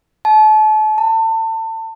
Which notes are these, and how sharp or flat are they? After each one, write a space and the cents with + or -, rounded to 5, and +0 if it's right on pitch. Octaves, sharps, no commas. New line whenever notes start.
A5 -35
A5 +30